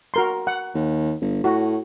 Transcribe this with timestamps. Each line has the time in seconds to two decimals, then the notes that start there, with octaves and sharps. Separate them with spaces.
0.14 F#4 A#4 C6
0.47 F#5
0.74 D#2
1.21 G1
1.44 A2 F#4